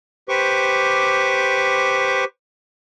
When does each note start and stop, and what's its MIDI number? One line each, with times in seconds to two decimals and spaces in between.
0.29 2.24 67
0.29 2.24 71
0.29 2.24 72
0.29 2.24 85
0.29 2.24 86